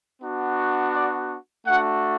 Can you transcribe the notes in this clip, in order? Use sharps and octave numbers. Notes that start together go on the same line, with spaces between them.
B3 D4 F#4
D5
A3 D4 F#4 F#5